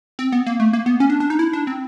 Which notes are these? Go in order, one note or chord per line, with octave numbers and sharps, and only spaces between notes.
C4
B3
A#3
A3
A#3
B3
C#4
D4
D4
D#4
E4
D4
C4